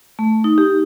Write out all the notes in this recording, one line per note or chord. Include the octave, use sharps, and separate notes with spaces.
A3
D#4
G4